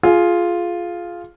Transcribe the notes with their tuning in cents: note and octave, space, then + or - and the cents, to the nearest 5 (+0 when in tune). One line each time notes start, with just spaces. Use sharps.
F4 +0 G#4 +15